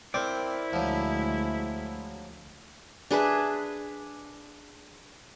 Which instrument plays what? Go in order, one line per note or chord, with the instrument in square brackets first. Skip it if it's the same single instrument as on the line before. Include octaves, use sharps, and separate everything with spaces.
[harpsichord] C4 [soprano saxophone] E4 [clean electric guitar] A#4 C5 D5
[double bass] D2 G#3 [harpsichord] F3 F#3
[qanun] D4 G#4 B4 E5